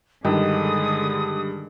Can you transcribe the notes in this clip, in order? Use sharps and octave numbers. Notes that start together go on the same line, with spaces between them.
G2 D3 D#3 G#3 D#6